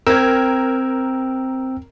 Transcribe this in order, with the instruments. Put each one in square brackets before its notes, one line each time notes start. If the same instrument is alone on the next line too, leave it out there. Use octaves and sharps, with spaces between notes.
[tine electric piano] C4 G5 E6 [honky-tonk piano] A#4 G#6